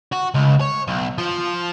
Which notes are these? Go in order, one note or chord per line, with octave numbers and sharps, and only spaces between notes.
F#4
C#2
C#5
B1
F3